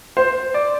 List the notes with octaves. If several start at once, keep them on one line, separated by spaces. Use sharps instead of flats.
C5
D5